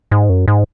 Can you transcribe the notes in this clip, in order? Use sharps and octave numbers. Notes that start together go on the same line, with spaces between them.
G#2
F#2
G#2